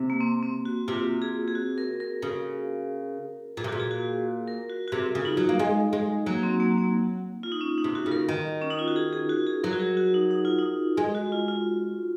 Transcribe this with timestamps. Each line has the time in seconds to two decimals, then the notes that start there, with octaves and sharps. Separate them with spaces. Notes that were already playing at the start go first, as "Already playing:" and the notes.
Already playing: C3
0.10 A#3
0.21 C4
0.43 C4
0.65 F#4
0.88 C3 F4
1.22 G#4
1.48 G#4
1.55 F#4
1.78 A#4
2.00 A#4
2.22 C#3
3.57 A#2 G#4
3.64 C3
3.68 A#2 F#4
3.80 G#4
3.91 F#4
4.48 A#4
4.70 F#4
4.88 F#4
4.92 C3 G#4
5.15 C#3
5.21 F4
5.25 D#4
5.37 F#3
5.49 A#3
5.59 G#3
5.93 G#3
6.26 F#3 A#3
6.43 C4
6.60 A#3
6.78 A#3
7.43 F4
7.52 D#4
7.61 C#4
7.78 D#4
7.84 C3
7.95 F#4
8.06 C#3
8.12 A#4
8.29 D#3
8.62 C#4
8.70 D#4
8.79 F4
8.88 F#4
8.96 G#4
9.13 G#4
9.29 F#4
9.47 G#4
9.63 F#3 A#4
9.73 F#4
9.80 G#4
9.97 F#4
10.14 D#4
10.31 D#4
10.45 F4
10.58 D#4
10.97 G#3
11.15 F#4
11.32 F4
11.48 F4